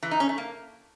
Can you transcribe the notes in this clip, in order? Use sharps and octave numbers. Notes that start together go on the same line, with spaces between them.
E3
D#4
C#4
A3
A#3